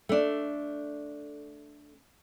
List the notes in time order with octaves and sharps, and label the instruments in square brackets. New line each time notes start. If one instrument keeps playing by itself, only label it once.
[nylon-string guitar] A3 D4